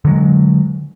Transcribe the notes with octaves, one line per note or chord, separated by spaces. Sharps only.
D3 F#3 G#3